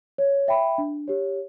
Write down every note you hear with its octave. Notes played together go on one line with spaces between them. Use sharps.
C#5
E5 G5 B5
D4
G4 C#5